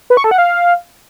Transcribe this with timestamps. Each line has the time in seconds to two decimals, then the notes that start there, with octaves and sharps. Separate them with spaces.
0.10 B4
0.17 C#6
0.24 A4
0.31 F#5
0.38 F5